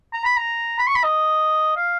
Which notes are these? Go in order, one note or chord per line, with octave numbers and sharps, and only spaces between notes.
A#5
B5
A#5
B5
C#6
B5
D#5
F5